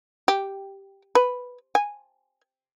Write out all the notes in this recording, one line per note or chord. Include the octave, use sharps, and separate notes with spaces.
G4
B4
G#5